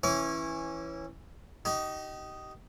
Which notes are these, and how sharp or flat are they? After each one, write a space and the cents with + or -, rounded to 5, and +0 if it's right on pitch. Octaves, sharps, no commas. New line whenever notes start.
E3 +0 C#4 -20 D6 -45
D#4 +0 G4 -35